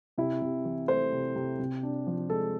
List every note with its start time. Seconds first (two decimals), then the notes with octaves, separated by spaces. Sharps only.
0.18 C3 E4
0.42 C3
0.65 E3
0.88 A3 C5
1.12 C3
1.36 C3
1.59 C3
1.83 D4
2.07 F3
2.30 G#3 A4